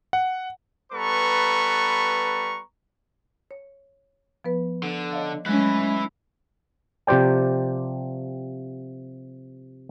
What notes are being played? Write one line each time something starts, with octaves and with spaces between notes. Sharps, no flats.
F#5
G3 B3 A4 B4 A#5 C#6
C#5
F3 B3 B4
D3
C#5 D#5 F5
F#3 G#3 A3 C#4 E4 B4
C3 F3 G4 C5 D5 G5